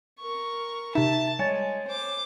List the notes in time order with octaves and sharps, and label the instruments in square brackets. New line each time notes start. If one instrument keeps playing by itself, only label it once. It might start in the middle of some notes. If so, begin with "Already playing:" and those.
[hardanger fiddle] A#4 C#6
[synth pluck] C3 D#4 [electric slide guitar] E5 [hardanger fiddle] A5
[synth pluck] G3 [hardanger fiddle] G#3 [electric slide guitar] C#5 [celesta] G#5 A6
[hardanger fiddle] C5 D6